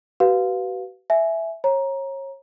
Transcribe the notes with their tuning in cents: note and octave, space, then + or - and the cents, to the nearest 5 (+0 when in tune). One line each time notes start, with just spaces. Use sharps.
F#4 +45 B4 +0 F5 +15
E5 +0 G#5 +15
C#5 -30 A#5 +15